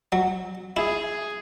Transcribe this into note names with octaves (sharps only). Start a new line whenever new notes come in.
F#3
E4 G#4